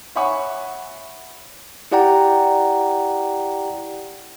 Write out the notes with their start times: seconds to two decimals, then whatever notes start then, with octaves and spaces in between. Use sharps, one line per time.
0.15 C#5 E5 F#5 G#5 B5 C#6
1.92 E4 G4 D5 F#5 G5 A#5